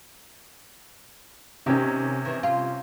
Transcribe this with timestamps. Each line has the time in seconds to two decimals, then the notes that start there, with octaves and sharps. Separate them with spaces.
1.66 C3 D#3 C#4 D#4 G4
2.25 D#3 E3
2.43 F4